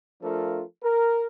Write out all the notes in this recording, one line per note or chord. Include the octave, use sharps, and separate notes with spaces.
F3 A3 D4 F4 A4 A#4
A#4